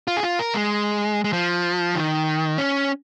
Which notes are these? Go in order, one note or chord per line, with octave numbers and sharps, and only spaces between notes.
F4
G#4
F4
A#4
G#3
G#3
F3
D#3
C#4